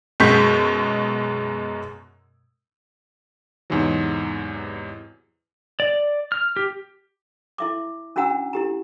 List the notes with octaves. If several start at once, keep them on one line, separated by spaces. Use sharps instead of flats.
F#2 B2 G#3 C#6 G6 B6
E2 G#2 C3 E3 F#3
D5
F6
G4
E4 E5 D6
C#4 D4 F#4 F#5 A#5 E6
E4 G4 A#5